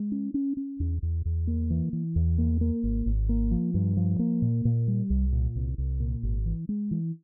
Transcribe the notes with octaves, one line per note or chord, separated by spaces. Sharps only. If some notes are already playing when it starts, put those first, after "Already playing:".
Already playing: G#3
C#4
C#4
C#4
E2
E2
E2
A#3
E3
E3
E2
A#3
A#3
G#1
G#1
A#3
F3
G2
F3
A#3
A#2
A#2
G3
C2
A#2
C2
C2
A#2
G#1
E3
G#3
E3